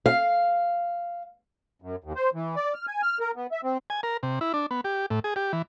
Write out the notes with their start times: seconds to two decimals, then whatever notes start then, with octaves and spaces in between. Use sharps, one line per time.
0.06 F5
1.82 F#2
2.04 D#2
2.16 C5
2.34 E3
2.56 D5
2.74 F6
2.87 G#5
3.02 F6
3.20 A#4
3.36 B3
3.52 E5
3.64 C4
3.90 G#5
4.03 A#4
4.23 C3
4.41 E4
4.54 D4
4.71 B3
4.84 G4
5.10 A2
5.24 G#4
5.36 G4
5.53 E3